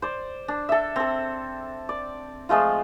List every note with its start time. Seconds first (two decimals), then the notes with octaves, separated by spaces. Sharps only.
0.02 C5 D5
0.48 D4
0.69 A4 E5
0.96 C4 A4
1.89 D5
2.49 F3 G#3 A3 F4